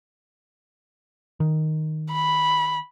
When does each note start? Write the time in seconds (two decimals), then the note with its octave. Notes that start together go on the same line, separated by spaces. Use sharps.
1.40 D#3
2.12 B5